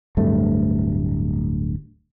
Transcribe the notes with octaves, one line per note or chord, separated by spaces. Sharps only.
D1 G2 A3